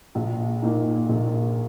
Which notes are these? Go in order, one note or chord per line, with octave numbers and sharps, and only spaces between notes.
A#1
A#2 A#3 D#4
A#1